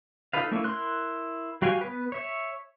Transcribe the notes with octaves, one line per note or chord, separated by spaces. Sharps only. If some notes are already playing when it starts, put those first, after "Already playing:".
D#4 F4 A4 B4 F5
A3 A#3 C#4 E4
E4 A#4 C6 F#6
G3 F#4 F5 G5 G#5
B3 B4
C#5 E5